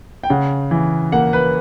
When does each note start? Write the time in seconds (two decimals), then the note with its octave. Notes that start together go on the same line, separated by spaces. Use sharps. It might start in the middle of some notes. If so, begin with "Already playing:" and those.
0.24 G5
0.30 C#3 F#5
0.71 E3
1.12 A#3 F#5
1.33 B4